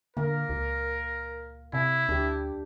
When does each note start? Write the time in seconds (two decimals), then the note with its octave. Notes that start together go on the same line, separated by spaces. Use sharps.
0.17 D3 A#3 A#4
0.49 C#2
1.73 C3 E4
2.09 D2 D4 G4